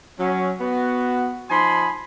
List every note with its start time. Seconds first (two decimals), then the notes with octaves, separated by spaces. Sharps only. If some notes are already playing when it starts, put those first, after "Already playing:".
0.19 F#3 C#4
0.60 B3 F#4
1.50 F3 D#4 G#5 B5 C6